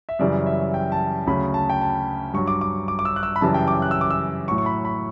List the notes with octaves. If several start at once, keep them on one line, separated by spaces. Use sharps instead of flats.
E5
F#2 C#3 E3 G3 D5
E5
G5
A5
D2 C#3 F#3 B5
A5
G5
A5
G2 F#3 C#6
D6
D6
D6
D6
E6
F#6
E6
B5
F#2 C#3 E3 G3 A5
G5
D6
F#6
E6
D6
E6
A2 F#3 C#6
C#6
B5
B5